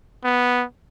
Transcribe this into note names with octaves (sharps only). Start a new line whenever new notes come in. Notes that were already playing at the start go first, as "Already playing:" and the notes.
B3